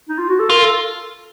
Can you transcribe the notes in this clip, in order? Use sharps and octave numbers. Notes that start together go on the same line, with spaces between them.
D#4
F4
F#4
A4
F4 A#4
A4